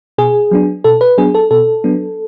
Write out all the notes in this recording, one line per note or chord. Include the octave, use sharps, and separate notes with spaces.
B2 G#4
F#3 B3 D4
B2 A4
B4
F#3 B3 D4 G#4
A4
B2 A4
F#3 B3 D4